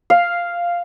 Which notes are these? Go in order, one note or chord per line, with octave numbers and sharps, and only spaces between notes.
F5